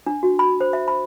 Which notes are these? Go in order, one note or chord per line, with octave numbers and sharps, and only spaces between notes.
D4
F#4
B5
C5
E5
B5